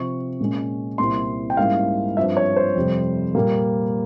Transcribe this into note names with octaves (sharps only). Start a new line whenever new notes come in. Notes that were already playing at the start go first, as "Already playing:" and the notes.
Already playing: C3 F3 C4 C#6
A#2 G#3 C#4
C2 A#2 G3 C4 E4 C6
G5
G#2 G3 A#3 C#4 E4 F5
G2 F3 C4 E5
C#5
C5
F2 C3 G3
A#2 G3 A#3